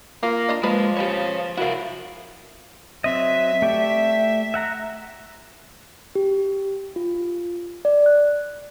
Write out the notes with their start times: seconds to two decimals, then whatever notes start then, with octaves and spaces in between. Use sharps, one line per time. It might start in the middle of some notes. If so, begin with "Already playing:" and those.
0.23 A#3 F4
0.49 D4 F4 D#5
0.63 F3 G#3 A#3 B4
0.97 G4 B4 C#5 F5
1.57 E4 F#4 A#4 F5
3.04 F#3 C4 D#5 E5
3.62 A3 G4 D5
4.54 E5 F#5 A#5
6.15 G4
6.96 F4
7.85 D5
8.06 F#6